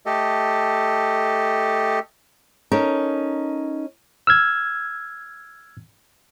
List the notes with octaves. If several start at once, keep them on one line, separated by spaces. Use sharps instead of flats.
A3 G4 A4 D#5
C#4 D#4 A4 A#4
E6 F6 G#6